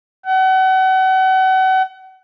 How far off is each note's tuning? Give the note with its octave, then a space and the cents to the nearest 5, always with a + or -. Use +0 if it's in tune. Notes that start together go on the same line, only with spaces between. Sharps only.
F#5 +35